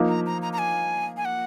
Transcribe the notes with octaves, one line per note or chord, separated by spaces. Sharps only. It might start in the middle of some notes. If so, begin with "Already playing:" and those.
Already playing: F3 A#3 D#4
A#5
A#5
A#5
A#5
G#5
G#5
F#5